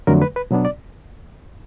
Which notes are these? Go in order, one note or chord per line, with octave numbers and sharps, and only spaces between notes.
F2 D3 F#3 A3 A#4
B4
B4
B2 F#3 B3 D4
D5